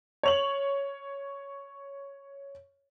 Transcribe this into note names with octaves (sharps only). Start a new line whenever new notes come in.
C#5 F7 F#7